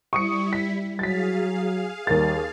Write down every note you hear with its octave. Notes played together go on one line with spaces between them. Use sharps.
G3 E4 C#6 D#6 C#7
B6
F#3 G#4 F5 A6 B6
D#2 D#3 G3 A#4 A6